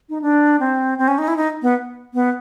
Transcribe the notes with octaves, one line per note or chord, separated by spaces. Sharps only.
D#4
D4
C4
C4
C#4
D#4
E4
D#4
B3
B3